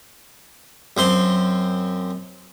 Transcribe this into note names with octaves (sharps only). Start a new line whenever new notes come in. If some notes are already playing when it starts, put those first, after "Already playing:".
F#2 C4 C6